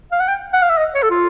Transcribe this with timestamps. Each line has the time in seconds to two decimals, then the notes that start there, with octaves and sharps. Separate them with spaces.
0.12 F5
0.20 F#5
0.28 G5
0.53 F#5
0.62 F5
0.69 E5
0.77 D#5
0.94 C#5
1.03 A4
1.10 F4